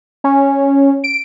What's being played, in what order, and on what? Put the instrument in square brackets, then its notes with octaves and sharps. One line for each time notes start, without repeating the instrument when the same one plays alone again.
[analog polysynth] C#4
D7